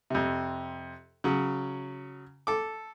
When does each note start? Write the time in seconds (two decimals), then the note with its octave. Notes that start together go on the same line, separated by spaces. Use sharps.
0.10 F2 C3
1.24 C#3 F#3
2.47 A4 D6